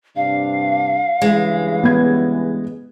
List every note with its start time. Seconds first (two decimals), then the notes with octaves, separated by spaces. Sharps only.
0.16 G2 C3 D4 F5
1.22 G2 C#3 E3 G#3
1.84 B3 G#6